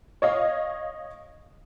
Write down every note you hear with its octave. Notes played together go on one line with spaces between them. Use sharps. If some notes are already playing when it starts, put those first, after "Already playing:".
C#5 D#5 F5